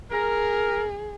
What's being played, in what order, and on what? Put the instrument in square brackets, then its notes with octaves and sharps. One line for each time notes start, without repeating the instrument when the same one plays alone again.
[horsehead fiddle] G#4 [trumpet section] A#4